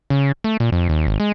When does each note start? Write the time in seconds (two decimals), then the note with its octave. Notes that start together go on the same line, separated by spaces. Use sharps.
0.10 C#3
0.44 A3
0.60 A#2
0.72 F2
0.89 D#2
1.07 G#1
1.20 G#3